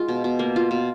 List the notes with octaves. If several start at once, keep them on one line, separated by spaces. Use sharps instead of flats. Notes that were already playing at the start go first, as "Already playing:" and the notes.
Already playing: G#3 D#4 F4 F#4
B2
B2
A#3
F4
B2